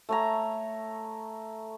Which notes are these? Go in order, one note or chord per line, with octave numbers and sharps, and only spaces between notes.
A3 C#5 A#5